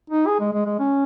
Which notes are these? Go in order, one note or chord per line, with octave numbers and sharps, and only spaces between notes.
D#4
G#4
G#3
G#3
G#3
C#4